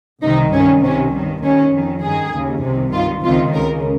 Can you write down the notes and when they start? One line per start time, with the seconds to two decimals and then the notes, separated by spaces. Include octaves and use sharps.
0.23 C2 C3 D#3 D#4
0.53 G2 D#3 C#4
0.83 C2 C3 D#3 C#4
1.13 G2 D#3
1.43 D#2 D#3 C#4
1.74 F2 D#3
2.04 G2 D#3 G#4
2.34 D#2 C#3
2.63 C2 C3 D#3
2.93 G2 D#3 F4
3.24 C#2 C3 D#3 F4
3.53 C#2 C#3 A#4